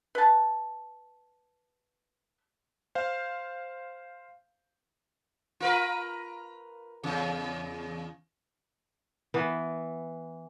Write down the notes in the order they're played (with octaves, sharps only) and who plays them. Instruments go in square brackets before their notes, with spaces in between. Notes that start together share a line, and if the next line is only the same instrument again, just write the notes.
[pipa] B4 A5
[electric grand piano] C5 F5
[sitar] F4 A#4 B4
E2 C#3
[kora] E3 B3